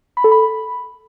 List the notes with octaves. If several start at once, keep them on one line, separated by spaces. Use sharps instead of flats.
B5
A4
B5